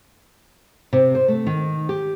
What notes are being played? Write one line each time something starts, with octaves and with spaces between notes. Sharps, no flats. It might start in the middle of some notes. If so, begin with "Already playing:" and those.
C3
C5
A3
D#3
G4